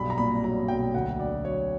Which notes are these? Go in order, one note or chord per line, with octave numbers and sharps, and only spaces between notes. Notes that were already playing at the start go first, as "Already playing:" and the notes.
Already playing: B1 G2 B5
A#5
A#2 B5
F#3 A#5
B1 G5
D2 F#5
D3 D5
F#3 C#5